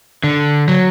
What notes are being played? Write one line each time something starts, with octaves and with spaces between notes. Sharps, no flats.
D3
F#3